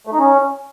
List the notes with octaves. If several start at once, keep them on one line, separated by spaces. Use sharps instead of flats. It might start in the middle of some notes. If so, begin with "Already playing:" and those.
A3
D#4
C#4